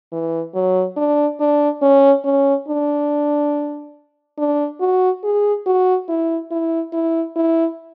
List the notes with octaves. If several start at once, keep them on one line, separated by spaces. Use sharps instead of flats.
E3
F#3
D4
D4
C#4
C#4
D4
D4
F#4
G#4
F#4
E4
E4
E4
E4